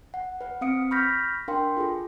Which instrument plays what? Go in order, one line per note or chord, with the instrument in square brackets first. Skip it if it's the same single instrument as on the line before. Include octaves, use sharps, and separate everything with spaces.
[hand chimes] F#5
B4 F#5
C4 F5 D#6 C#7 D7
B5 C#6 F6 G6 A#6 B6
D4 A#4 F5 G5 C6
F4 G#4 A4